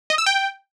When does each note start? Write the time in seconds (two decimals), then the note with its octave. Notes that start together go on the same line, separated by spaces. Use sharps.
0.10 D#5
0.18 E6
0.26 G5